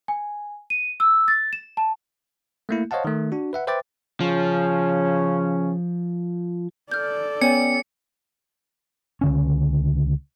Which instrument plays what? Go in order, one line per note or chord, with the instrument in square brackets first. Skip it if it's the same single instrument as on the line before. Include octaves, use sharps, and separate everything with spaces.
[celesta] G#5
D#7
E6
A6
E7
A5
[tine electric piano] A3 A#3 E4
C5 C#5 D#5 F5 F#5 A5
D#3 A3
D4 F#4
B4 E5 F#5
B4 C5 E5 G5 D6 A6
[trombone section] C#3 C#4 [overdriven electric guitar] F3
[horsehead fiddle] A4 D5 [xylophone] F6 G6
[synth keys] B3 C#4 G5 [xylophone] C#5 G#5 [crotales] C#7
[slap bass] C#2 D3 C#4